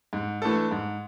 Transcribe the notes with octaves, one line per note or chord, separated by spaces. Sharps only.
G#2
E3 A3 D4 A4
G#2